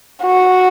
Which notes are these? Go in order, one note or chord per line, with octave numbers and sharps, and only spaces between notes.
F#4